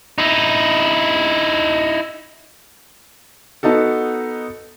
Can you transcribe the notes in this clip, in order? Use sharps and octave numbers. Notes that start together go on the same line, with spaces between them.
D#4 E4
B3 D#4 F#4 A4